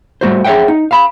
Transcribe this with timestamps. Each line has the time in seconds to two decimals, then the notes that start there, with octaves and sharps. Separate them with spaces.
0.21 G3 A3 F#4 C5
0.44 G#4 C#5 D#5 E5 F#5 G5
0.68 D#4
0.91 F5 B5